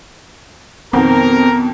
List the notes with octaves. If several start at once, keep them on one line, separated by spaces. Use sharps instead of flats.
F2 B2 D#3 B3 C4 A#4